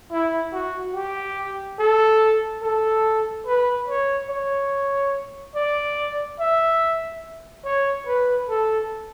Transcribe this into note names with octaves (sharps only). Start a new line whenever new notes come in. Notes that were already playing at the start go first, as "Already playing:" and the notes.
E4
F#4
G4
A4
A4
B4
C#5
C#5
D5
E5
C#5
B4
A4